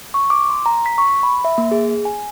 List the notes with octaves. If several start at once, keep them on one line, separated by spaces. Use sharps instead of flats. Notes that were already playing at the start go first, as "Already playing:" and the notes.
C#6
D6
C6
A#5
B6
C#6
B5
E5
A#3
G#4
G#5